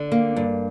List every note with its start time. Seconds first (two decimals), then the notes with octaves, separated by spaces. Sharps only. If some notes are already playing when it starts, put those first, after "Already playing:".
Already playing: D3
0.12 A#3
0.36 G2